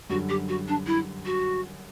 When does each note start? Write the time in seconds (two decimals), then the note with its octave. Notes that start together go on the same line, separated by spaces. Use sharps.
0.10 F#2 D3 G3 F#4
0.29 G4
0.49 F#4
0.68 D4
0.87 E4
1.26 F#4